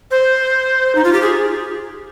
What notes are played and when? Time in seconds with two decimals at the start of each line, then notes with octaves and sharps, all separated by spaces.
0.11 C5
0.95 D#4
1.04 F4
1.13 G4
1.22 G#4